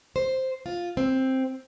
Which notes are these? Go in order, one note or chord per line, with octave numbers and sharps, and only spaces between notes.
C5
F4
C4